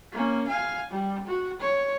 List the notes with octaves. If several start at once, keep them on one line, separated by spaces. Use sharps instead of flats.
A#3 C#4
F5 G#5
G3
F#4
C#5